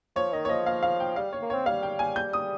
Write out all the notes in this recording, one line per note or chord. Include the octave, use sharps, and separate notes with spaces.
F3 C#5
D#3 D#5
C#5
F3 D#5
F5
F5
G5
G3 F5
C#5
A#3
C4 C#5
G3 F5
G5
G#5
G6
D#6